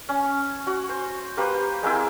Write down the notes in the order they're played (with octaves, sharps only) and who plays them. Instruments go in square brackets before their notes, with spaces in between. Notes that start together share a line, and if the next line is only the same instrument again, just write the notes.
[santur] C#4
F#4
C5
A#3 G4 B4 C5
G#3 A#3 C4 E4